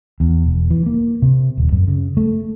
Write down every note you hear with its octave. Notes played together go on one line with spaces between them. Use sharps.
E2
E1
E3
A#3
C3
D#1
F#2
C#3
A3